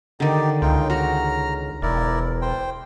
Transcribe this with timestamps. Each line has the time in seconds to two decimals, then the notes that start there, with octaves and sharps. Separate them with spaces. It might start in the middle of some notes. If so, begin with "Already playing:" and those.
0.20 D3 D#3 D#4 G4 D5
0.62 C#2 D#4 F4 G5
0.90 F#4 A#5 F6
1.82 E1 E4 A#4 D5
2.42 C5 G5